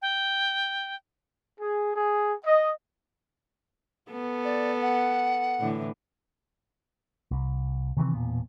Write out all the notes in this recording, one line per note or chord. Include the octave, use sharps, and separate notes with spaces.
G5
G#4
G#4
D#5
B3 A4
D5
F#5
A2 D3 E3
C2
C3 D#3 E3 C4
E1 A#2 B3